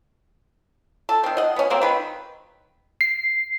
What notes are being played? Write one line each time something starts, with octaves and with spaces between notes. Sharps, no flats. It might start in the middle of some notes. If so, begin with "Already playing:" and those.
A4
D#3 C4
D#5 F#5
B3 C#4
F#3 A#3 C4
D#3 B4
C7